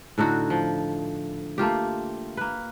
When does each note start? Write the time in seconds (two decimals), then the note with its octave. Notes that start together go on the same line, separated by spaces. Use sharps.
0.18 A2 D3 D#4 F#4
0.50 F3
1.58 A3 A#3 F4 G4
2.37 A#3 B4